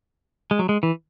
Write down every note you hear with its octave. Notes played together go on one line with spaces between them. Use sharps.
G#3
F#3
G#3
E3